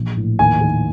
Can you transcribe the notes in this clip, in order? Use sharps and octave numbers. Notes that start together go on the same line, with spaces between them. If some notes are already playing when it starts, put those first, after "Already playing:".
Already playing: A#1
A2
D#2 G#5
D#3